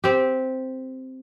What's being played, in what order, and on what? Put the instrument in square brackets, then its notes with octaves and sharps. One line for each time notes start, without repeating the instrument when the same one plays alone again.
[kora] C4 G4